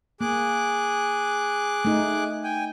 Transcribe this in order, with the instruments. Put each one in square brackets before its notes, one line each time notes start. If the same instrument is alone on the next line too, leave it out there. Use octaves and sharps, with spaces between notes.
[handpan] A#3 [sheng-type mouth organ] G#4 D6 F#6
[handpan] A3 D#4
[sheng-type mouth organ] G5 G#5